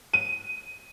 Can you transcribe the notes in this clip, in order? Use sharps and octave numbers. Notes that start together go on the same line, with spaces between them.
D#7